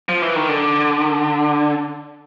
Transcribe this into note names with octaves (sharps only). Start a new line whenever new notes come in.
F3
E3
D#3
D3